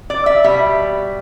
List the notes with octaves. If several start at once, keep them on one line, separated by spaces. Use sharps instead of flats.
D5
E5
B2 G3 E5